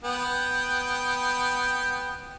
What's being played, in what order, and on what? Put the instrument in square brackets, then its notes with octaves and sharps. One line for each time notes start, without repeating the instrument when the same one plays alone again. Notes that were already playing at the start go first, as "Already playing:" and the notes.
[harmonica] B3 G5